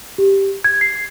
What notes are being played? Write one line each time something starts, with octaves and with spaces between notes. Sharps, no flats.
G4
G#6
C7